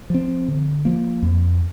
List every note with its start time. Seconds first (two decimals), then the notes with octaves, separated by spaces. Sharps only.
0.10 F3 C4
0.48 D3
0.85 F3 A#3
1.23 F2